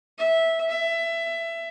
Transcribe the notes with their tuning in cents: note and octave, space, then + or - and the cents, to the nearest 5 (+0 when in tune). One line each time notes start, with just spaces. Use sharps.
E5 -10
E5 +20